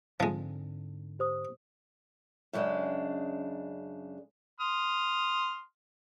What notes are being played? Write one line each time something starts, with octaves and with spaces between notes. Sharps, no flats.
G#2 D3 F3 G#3 C4
G4 C5 D#6
F#2 C#3 G#3 D4
C6 D#6 F6